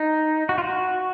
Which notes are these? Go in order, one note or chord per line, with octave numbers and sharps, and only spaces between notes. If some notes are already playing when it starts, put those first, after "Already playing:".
Already playing: D#4
F#4
F4
F#4